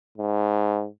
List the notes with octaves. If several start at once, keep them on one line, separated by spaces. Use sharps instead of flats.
G#2